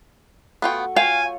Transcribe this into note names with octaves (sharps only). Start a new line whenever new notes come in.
A3 B3 F4 F#4 G5 C#6
F4 C#5 F5 G5 G#5